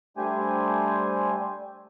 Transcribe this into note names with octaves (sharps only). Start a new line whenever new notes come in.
G3 A3 D4 G4 C5 G#5